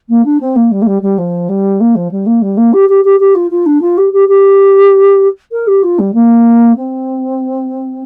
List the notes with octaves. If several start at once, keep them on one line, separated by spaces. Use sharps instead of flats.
A#3
D4
C4
A#3
G3
A#3
G3
G3
F3
G3
A#3
F3
G3
A#3
G3
A#3
G4
G4
G4
G4
F4
F4
D4
F4
G4
G4
G4
A#4
G4
F4
G3
A#3
C4